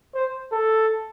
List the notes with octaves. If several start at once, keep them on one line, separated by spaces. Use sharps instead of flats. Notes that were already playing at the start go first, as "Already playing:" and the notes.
C5
A4